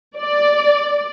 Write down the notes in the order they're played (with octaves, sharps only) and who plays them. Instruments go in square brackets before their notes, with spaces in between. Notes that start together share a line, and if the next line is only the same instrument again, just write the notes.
[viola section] D5